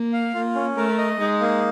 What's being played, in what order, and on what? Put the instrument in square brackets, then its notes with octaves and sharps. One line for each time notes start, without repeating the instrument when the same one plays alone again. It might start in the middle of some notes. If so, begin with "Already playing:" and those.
Already playing: [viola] A#3
[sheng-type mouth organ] F5
[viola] A#3 [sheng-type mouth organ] F4
[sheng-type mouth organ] C#4
[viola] A3 [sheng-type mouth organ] A#4
[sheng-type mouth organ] D#5
[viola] G#3 [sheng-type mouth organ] D#4
[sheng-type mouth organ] A#3